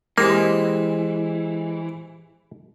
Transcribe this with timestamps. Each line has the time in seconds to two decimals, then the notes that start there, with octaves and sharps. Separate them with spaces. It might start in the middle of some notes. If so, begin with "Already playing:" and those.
0.18 E3 G#3 A#3 C4 G4 C6